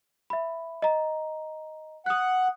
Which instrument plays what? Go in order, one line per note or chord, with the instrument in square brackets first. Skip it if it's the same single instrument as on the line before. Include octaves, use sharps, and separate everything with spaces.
[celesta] E5 B5
D#5 A#5
[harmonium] F#5 [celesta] D#6 F#6